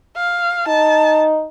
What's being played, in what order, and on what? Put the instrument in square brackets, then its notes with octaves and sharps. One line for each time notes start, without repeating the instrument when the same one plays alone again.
[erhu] F5
[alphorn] D#4 [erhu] A5